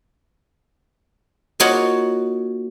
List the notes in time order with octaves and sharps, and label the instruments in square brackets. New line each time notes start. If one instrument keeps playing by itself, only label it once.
[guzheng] A#3 D#4 F4 F#4 C#5